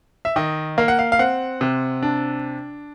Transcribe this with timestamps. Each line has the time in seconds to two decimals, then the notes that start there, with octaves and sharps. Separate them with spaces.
0.25 E5
0.36 D#3 D#5
0.78 A#3 F5
0.88 F#5
0.99 F5
1.12 F5
1.19 C4 F#5
1.61 C3
2.03 D4